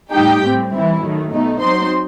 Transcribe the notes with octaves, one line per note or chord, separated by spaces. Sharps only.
A2 G3 D#4 G4 G5
A2 G3 C4
E3 G3 C4 E4
D#3 F#3 A3
B2 A3 D#4
F#3 C4 D#4 C5 C6